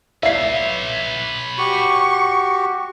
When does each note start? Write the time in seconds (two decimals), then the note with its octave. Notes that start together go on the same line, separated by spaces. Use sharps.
0.23 B4 C#5 E5 C7
1.58 F#4 G4 C#6